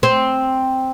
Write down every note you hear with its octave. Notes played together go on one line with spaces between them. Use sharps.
C4